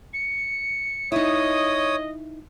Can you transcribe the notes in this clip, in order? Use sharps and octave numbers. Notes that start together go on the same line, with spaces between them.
C#7
D#4 E4 C#5 D#5 D#6